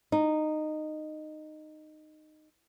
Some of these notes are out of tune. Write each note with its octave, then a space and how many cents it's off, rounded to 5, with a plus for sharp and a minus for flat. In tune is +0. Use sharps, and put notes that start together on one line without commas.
D#4 -15